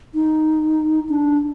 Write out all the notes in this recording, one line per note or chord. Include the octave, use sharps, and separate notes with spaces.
D#4
D4